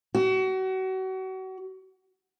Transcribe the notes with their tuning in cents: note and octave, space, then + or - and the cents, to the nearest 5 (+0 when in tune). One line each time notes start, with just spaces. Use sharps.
F#4 +35